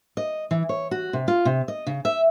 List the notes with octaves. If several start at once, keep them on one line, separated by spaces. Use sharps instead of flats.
D#5
E3
C#5
F#4
C3
F4
C3
D#5
C#3
E5